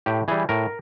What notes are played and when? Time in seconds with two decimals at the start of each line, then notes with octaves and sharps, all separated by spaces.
0.06 A2 G4
0.28 E3 G3 G#4
0.49 A2 A#4